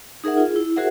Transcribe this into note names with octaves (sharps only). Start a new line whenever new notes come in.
D#4 G#4 A#4 E5 F#5
F4 G#4
E4
F#4 G#4 A#4 C5 E5 F#5